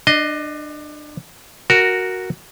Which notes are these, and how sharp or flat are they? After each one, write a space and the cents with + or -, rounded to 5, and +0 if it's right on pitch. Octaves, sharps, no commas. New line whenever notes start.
D4 +25 D#5 +0
F#4 +0 A#4 +0